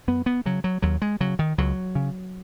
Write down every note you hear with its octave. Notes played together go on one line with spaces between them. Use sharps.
F#2 B3
B3
C#3 F#3
F#3
D#2 F#3
G#3
C#3 F#3
D#3
C#2 F#3
C#3